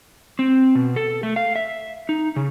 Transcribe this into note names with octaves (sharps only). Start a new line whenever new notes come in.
C4
B2
A4
A3
F5
E5
D#4
C#3